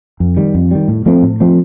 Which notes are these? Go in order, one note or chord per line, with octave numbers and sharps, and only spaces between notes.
F2
D#3 G3
F2
D#3 G3
A2
F3 A3 C4
A2
F3 A3 C4